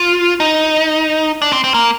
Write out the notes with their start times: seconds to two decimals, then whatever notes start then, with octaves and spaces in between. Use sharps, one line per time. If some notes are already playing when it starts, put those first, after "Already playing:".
Already playing: F4
0.40 D#4
1.42 D4
1.52 C4
1.64 C4
1.74 A#3